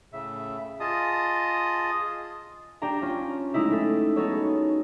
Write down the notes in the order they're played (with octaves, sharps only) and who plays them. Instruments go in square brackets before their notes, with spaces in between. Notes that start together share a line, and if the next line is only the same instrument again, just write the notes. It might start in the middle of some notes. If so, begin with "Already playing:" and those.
[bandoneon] A2 C#3 E5
F4 G#4 D#5 A5 D#6
[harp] D4 G4 G5 A#5
C#4 F4
G#3 A3 D#4 E4 G4
A3 A4
B3 D#4 F#4 A4 C#5
G#4